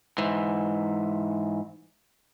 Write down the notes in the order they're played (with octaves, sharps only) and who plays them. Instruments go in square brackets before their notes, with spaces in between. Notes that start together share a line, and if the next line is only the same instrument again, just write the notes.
[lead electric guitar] G#2 E3